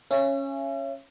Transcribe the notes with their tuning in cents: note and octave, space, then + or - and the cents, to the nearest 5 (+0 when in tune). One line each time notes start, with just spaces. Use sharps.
C#4 -10 E5 +45